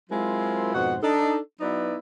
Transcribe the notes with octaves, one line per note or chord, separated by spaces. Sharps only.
F#3 G#3 C4 E4 F4 A#4
F2 G#2 B2 F#4 C5 F#5
D4 D#4 A4
F#3 B3 D#4 E4 B4 D5